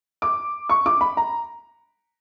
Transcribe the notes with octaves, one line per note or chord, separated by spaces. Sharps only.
D6
C#6
D6
B5
A#5